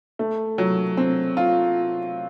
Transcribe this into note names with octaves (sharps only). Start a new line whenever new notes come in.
A3
F#3
C4
F4